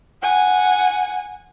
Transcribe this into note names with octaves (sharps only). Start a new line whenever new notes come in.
F#5 G#5